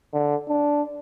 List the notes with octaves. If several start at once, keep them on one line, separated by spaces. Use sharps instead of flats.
D3
D4